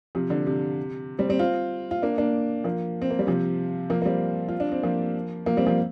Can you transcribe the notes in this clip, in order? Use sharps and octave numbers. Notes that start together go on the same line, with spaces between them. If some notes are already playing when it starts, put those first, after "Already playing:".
C3 F3
D3
C3
G3 C4
G3 C4
C4 F4
F4
A#3 D4
A#3 D4
F3 A#3
C4
A#3
G3
C3 F3
F3 A#3
A#3
G3 C4
F4
D4
C4
F3 A#3
F3 A#3
G3 C4
F3 A#3